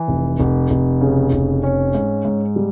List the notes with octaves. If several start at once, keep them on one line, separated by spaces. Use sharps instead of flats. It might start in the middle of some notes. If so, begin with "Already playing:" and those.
Already playing: E3
F1
F1
F1
C#3
F1
C#4
G#2
G#2
G3